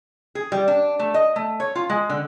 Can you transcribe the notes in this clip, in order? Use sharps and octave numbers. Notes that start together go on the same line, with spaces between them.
G#4
G3
D4
A3
D#5
A3
C#5
F4
G#3
D3